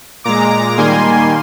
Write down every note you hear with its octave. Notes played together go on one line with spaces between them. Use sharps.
A#2 G#3 A#5 D6
D#3 G3 A#3 G#5 C6